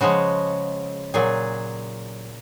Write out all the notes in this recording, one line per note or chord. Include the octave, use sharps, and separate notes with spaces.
C#3 F3 G#3 F#4
A#2 F#3 G#4